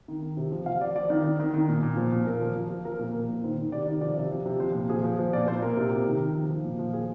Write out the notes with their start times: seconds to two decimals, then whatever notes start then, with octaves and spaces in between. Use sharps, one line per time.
0.08 D#3
0.22 D#3
0.37 C3
0.51 F3
0.66 F3 F5
0.81 F3 D5
0.95 F3 D5
1.10 D#3
1.24 D#3
1.39 D#3
1.54 D#3
1.69 A#2
1.83 A#2
1.97 F3
2.12 A#2
2.26 A#2 A#4
2.41 F3
2.56 F3
2.70 F3
2.85 F3 A#4
2.99 A#2
3.04 A#4
3.14 F3
3.29 A#2
3.44 D#3 C5
3.58 D#3
3.72 C3 D5
3.87 D#3
4.01 F3 D5
4.17 C3
4.30 F3
4.45 C3
4.60 F3 C5
4.75 A#2
4.89 F3 G#4
5.04 F3
5.19 F3
5.33 A#2 D5
5.48 A#2 C5
5.62 A#2 A#4
5.77 C3
5.91 C3
6.06 D#3
6.20 D#3
6.35 F3
6.50 F3
6.64 A#2
6.79 F3
6.93 F3 G#4